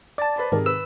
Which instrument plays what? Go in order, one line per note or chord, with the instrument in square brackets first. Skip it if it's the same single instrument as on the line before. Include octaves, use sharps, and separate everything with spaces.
[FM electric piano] D5 A5 [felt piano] A6
[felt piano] B4 C5 B5
[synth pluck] G#2 D#3 [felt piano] C3 G#4 A#4
[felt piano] B4 [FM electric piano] E6